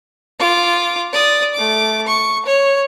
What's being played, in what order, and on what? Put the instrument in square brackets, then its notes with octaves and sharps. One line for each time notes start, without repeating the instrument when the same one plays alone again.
[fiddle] F4 D6
D5 D#6
A3 D6
C#6
C#5